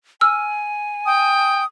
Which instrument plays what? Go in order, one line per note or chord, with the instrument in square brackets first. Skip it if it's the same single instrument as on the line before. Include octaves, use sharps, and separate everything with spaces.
[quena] G#5 [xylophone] E6 F6
[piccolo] G5 [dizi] D#6